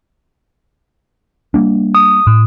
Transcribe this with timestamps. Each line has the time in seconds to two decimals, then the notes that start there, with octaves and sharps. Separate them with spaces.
1.54 G3 A#3 D4
1.95 D#6
2.27 A2